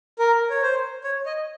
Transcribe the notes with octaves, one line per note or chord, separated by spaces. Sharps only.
A#4
C#5
C5
C#5
D#5